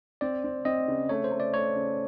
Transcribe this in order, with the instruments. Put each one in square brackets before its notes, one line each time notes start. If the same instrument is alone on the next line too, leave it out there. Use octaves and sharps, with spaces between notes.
[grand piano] C4 [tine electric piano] D5
[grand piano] C4
[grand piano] C4 [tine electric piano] D#5
[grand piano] C#3
[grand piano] A3 [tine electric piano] C#5
[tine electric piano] C5
[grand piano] A3
[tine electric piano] D5
[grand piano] A3 [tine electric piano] C#5
[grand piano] C#3